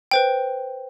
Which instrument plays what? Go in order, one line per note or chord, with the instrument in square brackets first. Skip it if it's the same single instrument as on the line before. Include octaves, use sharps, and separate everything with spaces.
[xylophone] B4 C5 G5